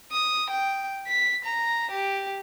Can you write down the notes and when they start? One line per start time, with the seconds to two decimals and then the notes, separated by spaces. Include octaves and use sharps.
0.12 D#6
0.50 G5
1.07 B6
1.44 A#5
1.91 G4